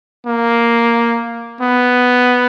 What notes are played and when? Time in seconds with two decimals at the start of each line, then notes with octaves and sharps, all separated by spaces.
0.27 A#3
1.61 B3